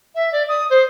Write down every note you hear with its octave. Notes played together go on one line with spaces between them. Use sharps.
E5
D5
D#6
C5